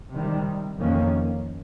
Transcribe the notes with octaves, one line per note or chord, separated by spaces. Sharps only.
C3 D#3 G3
F2 D#3 A#3 C#4